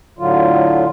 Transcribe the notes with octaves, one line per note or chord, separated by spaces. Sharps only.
A2 D3 F#3 F4